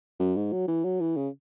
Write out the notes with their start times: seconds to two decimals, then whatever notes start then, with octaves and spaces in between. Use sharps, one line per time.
0.20 F#2
0.36 G#2
0.52 F#3
0.68 E3
0.85 F#3
1.01 E3
1.17 C#3